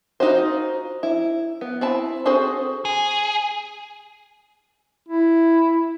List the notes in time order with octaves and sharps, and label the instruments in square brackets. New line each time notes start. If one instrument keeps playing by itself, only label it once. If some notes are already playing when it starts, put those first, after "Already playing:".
[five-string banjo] D#4 F4 F#4 C5
E4
B3
C4 E4 A5
C4 F#4 G#4 A4 C5
[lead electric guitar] G#4
[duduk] E4